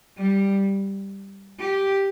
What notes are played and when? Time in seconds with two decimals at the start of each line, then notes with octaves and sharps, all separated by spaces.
0.18 G3
1.60 G4